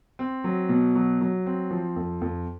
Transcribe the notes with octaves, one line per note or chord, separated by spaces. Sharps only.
C4
F#3
B2
F#3
F#3
C4
F3
F2
F2